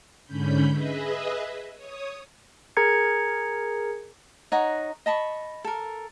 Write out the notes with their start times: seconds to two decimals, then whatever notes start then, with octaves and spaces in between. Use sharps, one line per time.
0.25 G#2 D3 C#4 B5 G6
0.68 G#4 B4 D#5 E5
1.76 C#5 D#6
2.77 G#4 A#4 A#5 G#6 C#7
4.52 D#4 C#5 F#5 A#5
5.06 D#5 A5 B5 C#6
5.65 A4 A#4